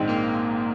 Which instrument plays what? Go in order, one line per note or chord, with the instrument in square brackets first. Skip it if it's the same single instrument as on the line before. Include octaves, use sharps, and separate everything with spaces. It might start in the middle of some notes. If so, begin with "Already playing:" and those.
Already playing: [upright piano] A#1 G#2 D#3 G#3 C4
[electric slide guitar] A#3